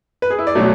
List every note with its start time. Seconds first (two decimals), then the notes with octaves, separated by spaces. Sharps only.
0.22 B4
0.30 G#4
0.39 E4
0.47 D5
0.55 B2 F#3 A3